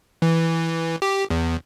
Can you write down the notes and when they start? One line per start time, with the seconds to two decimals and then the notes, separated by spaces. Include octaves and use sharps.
0.22 E3
1.02 G4
1.30 E2